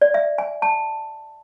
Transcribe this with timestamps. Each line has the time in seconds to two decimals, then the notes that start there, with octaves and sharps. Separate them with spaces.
0.01 D5
0.14 E5
0.38 G#5
0.62 A5